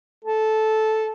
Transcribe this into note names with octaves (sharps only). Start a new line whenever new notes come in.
A4